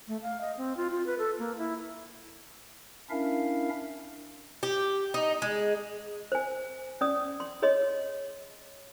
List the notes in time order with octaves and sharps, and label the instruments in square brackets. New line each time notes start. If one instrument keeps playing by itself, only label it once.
[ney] A3
F5
D#5
C4
F4
F4
B4
A4
A#3
E4
[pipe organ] C#4 D4 E4 A#4 E5 F5
[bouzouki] G4
D#4
G#3
[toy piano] C5 G#5
C#4 D5 D#6
C6
G#4 C#5 D#5 C6